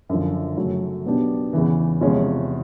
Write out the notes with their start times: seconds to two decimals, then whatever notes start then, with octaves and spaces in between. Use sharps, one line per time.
0.09 F#2 D3 F3
0.57 F#2 C#3 F#3 A3 C#4
1.06 B2 F#3 B3 D4 G4
1.53 E2 C#3 E3
2.01 E2 C3 F3 G#3 C#4